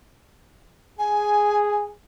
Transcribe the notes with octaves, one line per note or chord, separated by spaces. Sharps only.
G#4 G#5